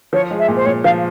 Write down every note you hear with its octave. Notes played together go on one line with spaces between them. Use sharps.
F3 C#5
G#3
E5
A#2
C5
A#2 C#5
F3 F5